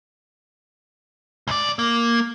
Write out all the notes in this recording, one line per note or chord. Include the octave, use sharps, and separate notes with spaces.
C#2 D5
A#3